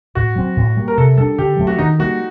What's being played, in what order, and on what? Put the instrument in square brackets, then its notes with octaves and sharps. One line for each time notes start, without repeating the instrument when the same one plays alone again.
[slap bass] A2 [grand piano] F#4
[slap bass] F#3 C4
A2
G3 A#3
[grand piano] A#4
[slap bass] C3 [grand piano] A4
[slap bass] G3 [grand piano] A4
[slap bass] D4
[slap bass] D3 [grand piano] G4
[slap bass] F#3 A3 C4
[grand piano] F#4
[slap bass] D#3 [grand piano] D#4
[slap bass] G3 A#3 [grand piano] F#4